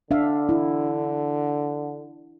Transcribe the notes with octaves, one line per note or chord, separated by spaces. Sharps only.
D3 D4 E5 F5
E4